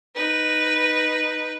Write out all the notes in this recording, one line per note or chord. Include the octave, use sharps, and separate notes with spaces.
D#4 B4